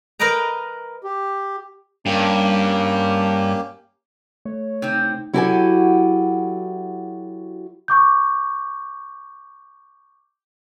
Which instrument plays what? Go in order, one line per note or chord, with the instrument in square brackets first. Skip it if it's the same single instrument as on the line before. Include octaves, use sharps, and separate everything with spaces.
[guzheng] A#4 B4 D#5 G5 A#5
[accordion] G4
[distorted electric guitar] G2 [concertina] A#3 C#4 G4
[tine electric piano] A3 [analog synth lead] C#5
[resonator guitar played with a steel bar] C3 C4 [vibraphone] D#4 G5
[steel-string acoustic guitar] F#3 E4 F#4 G4 A4 G#5
[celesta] C#6 D6 G6